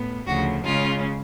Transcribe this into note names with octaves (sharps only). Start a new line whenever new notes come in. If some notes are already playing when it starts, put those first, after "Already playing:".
Already playing: A2 B3
D2 C#3 F3 F#4
C#3 G#3 C#4 F4